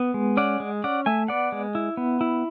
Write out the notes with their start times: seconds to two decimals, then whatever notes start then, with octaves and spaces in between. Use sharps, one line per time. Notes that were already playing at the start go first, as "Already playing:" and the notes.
Already playing: B3
0.14 G#3
0.37 C#4 D5 F#5
0.60 G#3
0.84 C#4 D5 F#5
1.06 A3 E5 G#5
1.28 B3 D5 F#5
1.52 G#3
1.75 E4
1.97 B3
2.21 E4